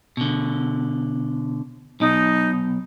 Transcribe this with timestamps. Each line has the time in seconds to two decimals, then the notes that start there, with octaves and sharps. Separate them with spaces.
0.17 B2 D3
2.00 B1 B2 D#4